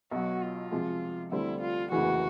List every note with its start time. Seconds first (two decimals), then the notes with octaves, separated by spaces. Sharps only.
0.11 B1 B2 F#3 F#4
0.42 F4
0.71 C3 F3 G#3
1.32 D2 D3 G3 C4 E4
1.61 F4
1.91 F1 D#2 C#3 E3 F#4